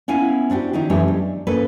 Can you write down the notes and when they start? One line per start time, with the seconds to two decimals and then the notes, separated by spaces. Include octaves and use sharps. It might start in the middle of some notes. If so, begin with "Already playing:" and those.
0.08 B3 C#4 E4 F5 G#5
0.50 C4 D4 F#4 G4
0.73 D#3 C#4 D#4 E4
0.90 F#2 E3 G#3 A3 G4 C#5
1.08 D4
1.47 G#2 A#3 C#4 A4 B4